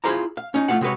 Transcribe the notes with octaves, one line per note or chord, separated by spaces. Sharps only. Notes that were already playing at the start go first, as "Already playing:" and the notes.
E4 F4 G#4 C5 F5 A#5
F5
C#4 D#4
A3 C#4 F4 F5 F#5
C3 G#3 F#4 B4 C#5